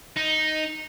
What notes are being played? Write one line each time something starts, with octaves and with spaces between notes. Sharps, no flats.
D#4